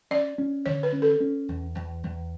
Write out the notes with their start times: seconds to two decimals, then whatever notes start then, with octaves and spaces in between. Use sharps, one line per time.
0.11 C#4 D5
0.38 C#4
0.66 D3 C#5
0.83 B4
0.92 C#4
1.02 A4
1.20 C#4
1.49 E2
1.75 E2
2.03 E2